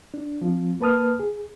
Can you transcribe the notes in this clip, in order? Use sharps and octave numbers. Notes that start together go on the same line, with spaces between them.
D4
F3 C4 F4
A#3 B4 A5 D#6 F6
G#4